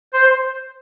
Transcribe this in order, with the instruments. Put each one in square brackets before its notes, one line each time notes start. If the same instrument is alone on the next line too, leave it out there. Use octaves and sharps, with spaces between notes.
[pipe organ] C5